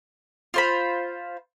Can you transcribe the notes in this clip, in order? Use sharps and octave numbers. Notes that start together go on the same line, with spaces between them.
F4 C5 B5